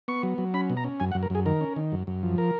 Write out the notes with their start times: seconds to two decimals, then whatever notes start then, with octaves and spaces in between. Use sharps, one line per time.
0.08 B3 C#6
0.23 F#3
0.38 F#3
0.54 C#4 B5
0.70 B2
0.77 A#5
0.84 C#4
1.00 F#2 G#5
1.12 F#5
1.15 F#2
1.23 A#4
1.30 F#2 G#4
1.46 D#3 A#4
1.61 C#4
1.76 D#3
1.92 F#2
2.07 F#2
2.23 F3
2.38 A#4